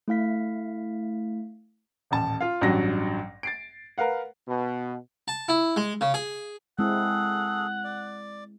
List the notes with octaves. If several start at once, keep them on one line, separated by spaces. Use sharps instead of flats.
A3 E4 F5 B6
D#1 A1 A5
F4 F5
A1 G2 F#3 A#6
A6 C7 D7
A#4 B4 F5 F#5
B2
A5
E4
G#3
C#3
G#4
G#3 C4 E4 G#4 A4 F#5
D5